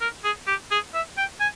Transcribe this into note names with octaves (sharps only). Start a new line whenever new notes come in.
A#4
G#4
G4
G#4
E5
G5
G#5